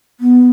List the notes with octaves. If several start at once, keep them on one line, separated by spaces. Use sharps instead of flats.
B3